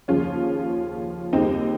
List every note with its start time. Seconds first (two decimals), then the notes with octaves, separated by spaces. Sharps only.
0.08 D#2 C#3 F3 C#4 F4
1.33 D#2 C#3 G3 C4 D#4